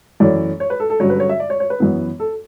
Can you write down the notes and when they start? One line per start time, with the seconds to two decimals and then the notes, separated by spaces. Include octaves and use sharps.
0.20 F#2 E3 A3 C#4 D5
0.60 C#5
0.70 B4
0.80 A4
0.90 A4
1.00 G2 D3 F#3 C#4 C#5
1.10 B4
1.20 C#5
1.29 E5
1.40 D5
1.50 C#5
1.60 C#5
1.70 B4
1.80 F#2 E3 B3
2.20 A4